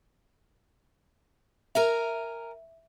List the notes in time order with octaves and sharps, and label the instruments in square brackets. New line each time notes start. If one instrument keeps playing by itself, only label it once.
[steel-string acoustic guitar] A#4 G#5 A#5 [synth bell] E5